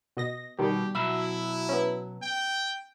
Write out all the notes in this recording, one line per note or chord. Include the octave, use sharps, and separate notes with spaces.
B2 D#5 A#6
B2 D#3 G3 G4
B2 F#3 E4 E5 B5
B3 C#4
G5